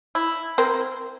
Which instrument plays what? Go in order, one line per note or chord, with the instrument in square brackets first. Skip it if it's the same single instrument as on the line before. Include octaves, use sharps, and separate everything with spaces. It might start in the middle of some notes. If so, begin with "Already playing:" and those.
[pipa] E4
[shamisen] C4 A#4 C5